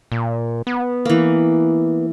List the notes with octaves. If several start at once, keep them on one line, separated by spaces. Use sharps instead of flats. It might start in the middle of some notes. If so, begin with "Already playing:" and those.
A#2
B3
E3 A#3